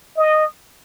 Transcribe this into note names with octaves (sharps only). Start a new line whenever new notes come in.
D#5